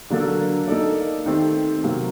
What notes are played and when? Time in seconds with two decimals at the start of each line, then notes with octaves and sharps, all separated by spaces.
0.10 D3 F#3 A#3 D4 A4
0.67 A#3 D#4 A4 D5
1.26 D#3 A3 C4 G4
1.83 C3 F#3 A#3